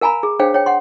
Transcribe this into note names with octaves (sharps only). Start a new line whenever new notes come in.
A#4 F5 G#5 A#5 B5
G#4
D4 G#4 C5 C#5 F5 G5
C#5 G5
F#5 C6